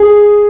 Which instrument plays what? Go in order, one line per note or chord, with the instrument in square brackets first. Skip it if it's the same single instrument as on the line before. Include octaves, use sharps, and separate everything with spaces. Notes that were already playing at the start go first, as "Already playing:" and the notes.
Already playing: [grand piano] G#4